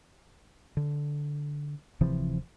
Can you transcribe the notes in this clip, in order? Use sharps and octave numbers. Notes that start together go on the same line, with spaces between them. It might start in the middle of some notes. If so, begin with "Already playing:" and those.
D3
D1 C3 E3 F3